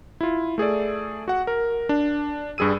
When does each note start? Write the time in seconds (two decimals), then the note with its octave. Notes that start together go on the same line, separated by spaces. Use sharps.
0.21 E4 F4
0.58 A3 G#4 A4 D5
1.28 F#4 F#5
1.47 A#4
1.89 D4
2.58 G2 G3 G#4 E6 D#7